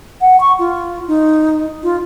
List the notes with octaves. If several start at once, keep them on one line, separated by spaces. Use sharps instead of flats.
F#5
C#6
F4
D#4
F4